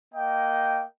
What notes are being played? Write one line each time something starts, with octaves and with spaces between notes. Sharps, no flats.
A#3 D#5 G5